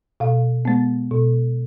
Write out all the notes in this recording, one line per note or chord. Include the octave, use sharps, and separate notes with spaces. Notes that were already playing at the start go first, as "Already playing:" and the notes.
B2 F5
G#3 B3
B2